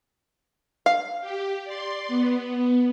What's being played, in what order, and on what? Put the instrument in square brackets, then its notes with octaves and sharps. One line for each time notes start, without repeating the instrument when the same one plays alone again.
[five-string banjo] F5
[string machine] G4
D5 C6
B3